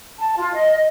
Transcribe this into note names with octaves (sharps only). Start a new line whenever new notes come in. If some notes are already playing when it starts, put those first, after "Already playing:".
A5
F4
D#5